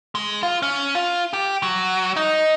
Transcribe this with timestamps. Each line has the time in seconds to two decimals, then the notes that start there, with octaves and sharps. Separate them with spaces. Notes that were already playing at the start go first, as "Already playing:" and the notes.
0.15 G#3
0.43 F4
0.62 C#4
0.95 F4
1.33 G4
1.63 F#3
2.16 D#4